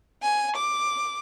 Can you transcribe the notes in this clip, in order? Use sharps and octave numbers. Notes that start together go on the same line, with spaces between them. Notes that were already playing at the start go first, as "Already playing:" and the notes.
G#5
D6